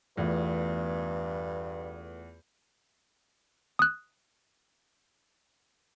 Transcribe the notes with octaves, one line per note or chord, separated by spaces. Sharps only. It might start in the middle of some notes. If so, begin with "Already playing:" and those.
E2 G2 A3 B3 F4
D#6 F#6